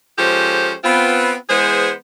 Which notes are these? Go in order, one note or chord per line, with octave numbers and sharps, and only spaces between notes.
F3 G#3 C#4 G4 A4 C5
B3 C4 F4
E3 G#3 B3 G#4 C5